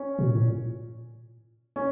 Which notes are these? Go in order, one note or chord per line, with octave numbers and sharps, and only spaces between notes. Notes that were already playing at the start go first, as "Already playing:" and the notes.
Already playing: C#4
B2
A#2
A2
A#2
C#4